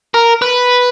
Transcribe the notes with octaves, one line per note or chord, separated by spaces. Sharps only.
A#4
B4